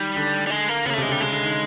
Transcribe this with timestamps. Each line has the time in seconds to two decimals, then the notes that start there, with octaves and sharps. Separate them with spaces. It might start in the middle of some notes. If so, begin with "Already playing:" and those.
Already playing: D#3 G3
0.16 D3
0.47 G3
0.51 G#3
0.69 A#3
0.86 C#3 B3
0.90 A#3
0.94 A3
0.98 C3 G#3
1.08 D3 G3
1.21 C#3 G#3
1.32 D3
1.43 D#3